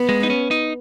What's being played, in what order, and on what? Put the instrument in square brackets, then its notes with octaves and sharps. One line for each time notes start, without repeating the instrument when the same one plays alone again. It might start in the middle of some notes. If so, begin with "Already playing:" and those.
Already playing: [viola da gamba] B3
[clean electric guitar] G#3
D#4
C#4
D#4